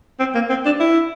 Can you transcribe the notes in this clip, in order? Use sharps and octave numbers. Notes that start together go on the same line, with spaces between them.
C4
A#3
C4
D4
E4